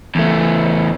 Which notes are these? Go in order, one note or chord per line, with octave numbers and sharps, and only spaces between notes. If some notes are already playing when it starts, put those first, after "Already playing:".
E2 A3